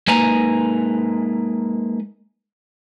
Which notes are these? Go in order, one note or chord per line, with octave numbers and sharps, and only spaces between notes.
G#3 A#3 D#4 B4 G#5 A#5